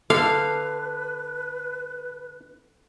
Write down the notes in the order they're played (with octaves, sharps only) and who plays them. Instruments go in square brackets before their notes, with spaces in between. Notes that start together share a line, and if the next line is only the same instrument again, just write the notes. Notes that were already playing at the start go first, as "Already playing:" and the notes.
[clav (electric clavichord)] D3 [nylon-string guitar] A4 [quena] B4 [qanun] F5